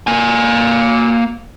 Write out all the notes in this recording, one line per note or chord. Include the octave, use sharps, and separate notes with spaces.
A#3 G#5